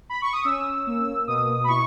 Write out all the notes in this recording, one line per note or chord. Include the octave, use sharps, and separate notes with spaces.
B5
C#6
D#6
C#4 E6
A#3
B2 D#6
B5
E4 C#6